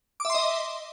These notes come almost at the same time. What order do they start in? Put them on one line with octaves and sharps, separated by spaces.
D6 E5 C6 D#5